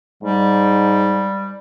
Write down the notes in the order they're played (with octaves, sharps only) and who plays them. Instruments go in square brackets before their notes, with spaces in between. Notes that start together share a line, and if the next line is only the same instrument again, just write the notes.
[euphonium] G#2 [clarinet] G3